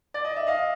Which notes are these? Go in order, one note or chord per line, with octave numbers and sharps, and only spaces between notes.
D5
D#5
E5
D#5 F5